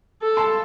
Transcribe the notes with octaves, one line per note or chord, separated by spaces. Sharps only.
A4
A5 C6